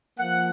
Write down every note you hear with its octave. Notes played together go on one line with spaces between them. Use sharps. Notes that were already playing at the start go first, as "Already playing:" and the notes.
F3 A#3 F#5